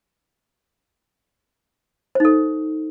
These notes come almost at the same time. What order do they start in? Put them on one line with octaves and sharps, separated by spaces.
C5 D#4 A4